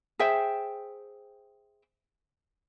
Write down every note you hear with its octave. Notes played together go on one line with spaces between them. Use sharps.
G#4 C5 E5 G5